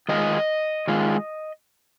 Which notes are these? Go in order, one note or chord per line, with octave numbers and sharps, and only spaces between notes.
D#3 G#3 F4 D#5
D#3 G#3 F4